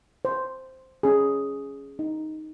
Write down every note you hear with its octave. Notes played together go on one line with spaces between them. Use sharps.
C5
C#4 G#4
D#4